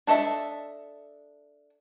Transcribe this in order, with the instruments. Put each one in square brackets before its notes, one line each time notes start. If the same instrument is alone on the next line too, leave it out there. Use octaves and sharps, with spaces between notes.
[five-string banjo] D4 A4 D#5 E5